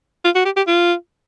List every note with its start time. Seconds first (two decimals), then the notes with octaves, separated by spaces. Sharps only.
0.25 F4
0.35 F#4
0.45 G4
0.57 G4
0.67 F4